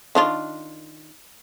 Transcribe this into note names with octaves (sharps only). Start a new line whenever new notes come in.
D#3 D4 F4